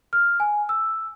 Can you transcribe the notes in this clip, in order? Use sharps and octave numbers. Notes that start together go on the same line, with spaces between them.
F6
G#5
E6